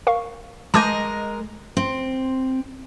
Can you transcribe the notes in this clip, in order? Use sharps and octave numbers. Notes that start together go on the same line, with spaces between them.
A#4 F5 C#6
G#3 A#4 D#5 A5 D6 G6
C4